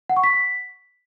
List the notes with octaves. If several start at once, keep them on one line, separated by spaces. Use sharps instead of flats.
F#5
C#6
B6